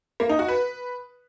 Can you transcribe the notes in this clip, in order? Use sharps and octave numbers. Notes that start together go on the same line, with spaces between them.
A#3
D#4
F#4
B4